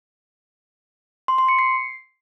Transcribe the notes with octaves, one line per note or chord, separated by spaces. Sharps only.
C6
C6
C#7
C7